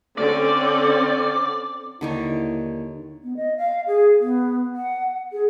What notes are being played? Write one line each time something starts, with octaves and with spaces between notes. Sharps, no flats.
D3 C4 C#4 D5
D#2 D3 D#3 E4 C#5
B3
D#5
F5
G#4
B3
F#5
G#4